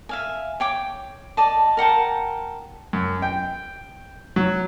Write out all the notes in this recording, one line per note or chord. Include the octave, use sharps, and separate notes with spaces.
E5 F5 G#5
C#5 G5 D6
D5 D#5 A5
A#4 F#5 G5 A5
F#2
G5
F#3